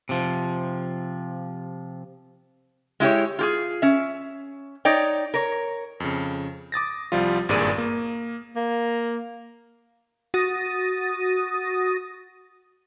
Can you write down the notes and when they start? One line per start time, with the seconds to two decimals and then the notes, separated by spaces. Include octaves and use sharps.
0.09 C3 F3
3.00 G#3 E4 G4 C#5
3.39 F4 G4 G#4
3.82 C#4 E5
4.85 D#4 C#5 D5 G5
5.34 A#4 C#5
6.00 F2 C#3
6.72 D6 D#6 A6 A#6
7.12 C2 F3 G3 F4
7.49 G#1 G2 A#2 G#4 D5 D#7
7.78 A#3
8.56 A#3
10.34 F#4 D#6 A6 A#6 D#7